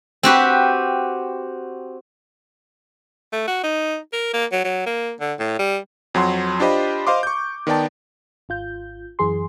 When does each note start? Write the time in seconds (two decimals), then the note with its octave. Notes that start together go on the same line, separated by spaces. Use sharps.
0.23 C4 F#4 G4 B4
3.33 A3
3.48 F#4
3.63 D#4
4.13 A#4
4.34 A#3
4.52 F#3
4.64 F#3
4.86 A#3
5.20 D3
5.39 A2
5.59 G3
6.14 F2 F#3 F#5 C6
6.60 D4 F4 G4 C5 D#5 B5
7.07 C5 D#5 F5 C6 D6
7.23 C#6 G6
7.67 D#3 B3 D5 G5 A5
8.49 G#1 F4 G6
9.19 F#2 E3 G#4 C6